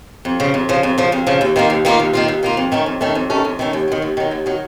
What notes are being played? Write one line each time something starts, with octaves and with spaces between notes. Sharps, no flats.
F2
C#3 F3
F2
C#3 F3
F2
C#3 F3
F2
C#3 F3
D#2
D#3 A#3 F4
D#2
D#3 A#3 F4
D#2
D#3 A#3 F4
D#2
D#3 A#3 F4
F2
D#3 A3 C#4
F2
D#3 A3 C#4
F2
D#3 A3 C#4
F2
D#3 A3 C#4
D#2
D#3 F#3
D#2
D#3 F#3
D#2
D#3 F#3